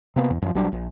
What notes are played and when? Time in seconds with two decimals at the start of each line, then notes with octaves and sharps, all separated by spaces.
0.16 C3 A#3 B3
0.30 E2
0.42 F#2 F3
0.55 A#1 F#3 G3 D4
0.72 A#1